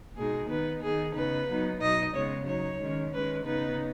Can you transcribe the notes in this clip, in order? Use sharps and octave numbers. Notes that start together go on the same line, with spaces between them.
B2 G#3 D#4 G#4
D#3 B3 D#4 B4
D#3 B3 D#4 G#4
C#3 B3 D#4 B4
F#3 B3 D#4
B2 F#3 D#4 D#5
C#3 G#3 B3 C#5
F#3 D#4 C#5
D#3 G#3 C#4
D#3 G#3 C#4 B4
C#3 B3 D#4 B4